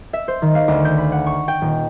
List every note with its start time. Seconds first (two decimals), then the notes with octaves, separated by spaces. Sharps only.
0.13 E5
0.28 C5
0.42 D#3
0.55 F5
0.68 D2
0.85 G6
0.98 B5
1.12 F#5
1.26 C#6
1.48 G5
1.62 D#1